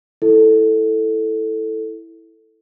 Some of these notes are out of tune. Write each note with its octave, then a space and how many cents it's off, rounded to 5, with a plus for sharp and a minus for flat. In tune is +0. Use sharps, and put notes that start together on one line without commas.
E4 +0 A4 +0